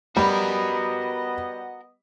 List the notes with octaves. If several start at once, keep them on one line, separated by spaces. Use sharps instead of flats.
G3 B3 F#4 A#4 D#5 B5